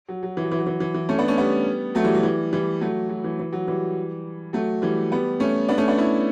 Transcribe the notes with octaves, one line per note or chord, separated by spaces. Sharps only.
F#3
F#3
E3
F#3
E3
F#3
E3
E3
E3
A3 C#4
B3 D4
A3 C#4
G3 B3
F#3 A3
E3 G3
F#3
E3 G3
E3 G3
F#3 A3
F#3
E3
E3
F#3
E3 G3
F#3 A3
E3 G3
G3 B3
A3 C#4
B3 D4
A3 C#4
B3 D4
C#4 E4